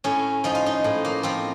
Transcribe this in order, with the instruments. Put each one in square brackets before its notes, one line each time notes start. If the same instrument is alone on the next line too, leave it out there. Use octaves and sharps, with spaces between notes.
[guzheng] A2 C#4
F3 D#4
F4
D#4
A2
A#3
F3 C4